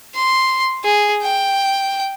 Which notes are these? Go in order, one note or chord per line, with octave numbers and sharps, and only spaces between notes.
C6
G#4
G5